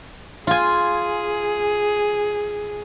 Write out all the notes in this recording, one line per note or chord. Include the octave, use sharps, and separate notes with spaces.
F4 G#4 G#5